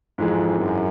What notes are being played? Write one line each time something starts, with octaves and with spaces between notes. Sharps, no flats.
F2 G#2 E3 G#3
F#2